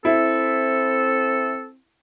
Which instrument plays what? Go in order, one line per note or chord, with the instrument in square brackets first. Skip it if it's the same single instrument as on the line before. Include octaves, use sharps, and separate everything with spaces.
[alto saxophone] C4 [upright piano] E4 [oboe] A4